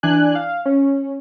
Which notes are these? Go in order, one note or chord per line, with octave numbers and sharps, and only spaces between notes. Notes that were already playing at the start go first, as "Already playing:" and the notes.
E3 D4 D5 G#5 F#6
F5
C#4